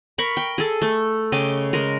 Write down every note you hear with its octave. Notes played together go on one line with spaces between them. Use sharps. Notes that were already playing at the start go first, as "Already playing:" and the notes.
A#4 B5 C#6
G5
G#4 A4
A3
C#3 D#5 G5 D6
G#3 A#4